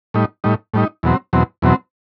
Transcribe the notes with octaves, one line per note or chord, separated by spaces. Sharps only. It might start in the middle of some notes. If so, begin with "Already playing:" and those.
A2 G3 D#4
A2 G3 D#4
A2 G3 D#4
E2 B2 F#3 C4
E2 B2 F#3 C4
E2 B2 F#3 C4